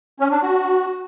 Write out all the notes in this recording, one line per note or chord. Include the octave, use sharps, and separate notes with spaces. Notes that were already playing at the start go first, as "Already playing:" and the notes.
C#4
D4
F#4